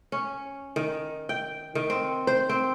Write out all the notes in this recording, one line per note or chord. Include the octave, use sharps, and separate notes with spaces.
C#4
D#3
G5
D#3
C4
C5
C4